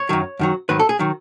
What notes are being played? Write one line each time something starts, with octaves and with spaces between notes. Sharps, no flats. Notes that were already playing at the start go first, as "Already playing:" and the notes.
Already playing: C#5
F#2 D#3 F#3
F#2 D#3 F#3
G#2 D#3 F#3 B4
A4
G#4
D#3 F#3